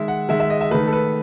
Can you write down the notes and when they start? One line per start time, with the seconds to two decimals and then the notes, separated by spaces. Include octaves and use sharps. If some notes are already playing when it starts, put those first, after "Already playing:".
Already playing: D#3 G#3 E5
0.08 F#5
0.29 D#3 G#3 E5
0.40 E5
0.50 D#5
0.61 E5
0.71 D#3 A3 B4
0.87 A4
0.93 B4